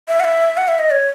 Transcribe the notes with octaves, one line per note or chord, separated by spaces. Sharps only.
E5
F#5
E5
F#5
E5
D#5
C#5